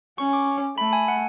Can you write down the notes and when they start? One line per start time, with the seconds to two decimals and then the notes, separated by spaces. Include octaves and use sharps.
0.18 C#4 C#6
0.33 D6
0.77 A3 B5
0.93 G#5
1.08 F#5